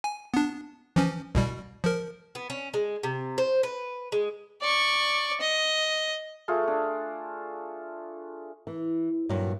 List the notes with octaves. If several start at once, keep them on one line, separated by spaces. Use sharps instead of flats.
G#5
B3 D4
E3 F3 C#4
C2 B2 G3
F3 A#4
B3
C#4
G#3
C3
C5
B4
G#3
D5 C#6
D#5
A3 F4 G#4 A4
D4
E3
G2 A#2 F#3